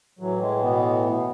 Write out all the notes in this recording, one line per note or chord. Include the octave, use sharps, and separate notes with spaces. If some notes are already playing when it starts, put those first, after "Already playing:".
A2 E3 F#3
G#3
B2 B3
B2